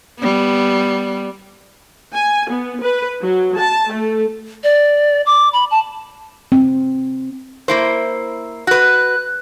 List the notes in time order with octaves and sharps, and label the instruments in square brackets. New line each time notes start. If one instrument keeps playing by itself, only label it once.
[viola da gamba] G3 B3
[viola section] G#5
B3
B4
F#3
A5
A3
[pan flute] D5
D6
B5
A5
[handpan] C4
[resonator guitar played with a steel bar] A#3 E4 C5
[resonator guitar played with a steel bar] F#4 B4 [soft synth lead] F#6